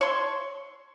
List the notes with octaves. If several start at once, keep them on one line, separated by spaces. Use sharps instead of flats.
C#5 C6